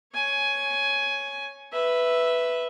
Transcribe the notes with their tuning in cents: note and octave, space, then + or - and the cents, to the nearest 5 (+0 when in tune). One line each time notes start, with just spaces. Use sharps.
C#5 +0 G#5 +10
B4 +0 E5 +0